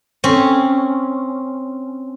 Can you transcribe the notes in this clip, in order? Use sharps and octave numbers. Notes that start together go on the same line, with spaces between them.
C4 C#4